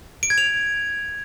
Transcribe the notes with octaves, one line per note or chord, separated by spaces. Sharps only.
D7
G#6
F7